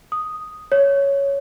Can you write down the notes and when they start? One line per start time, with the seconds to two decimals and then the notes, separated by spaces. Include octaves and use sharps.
0.12 D#6
0.72 C#5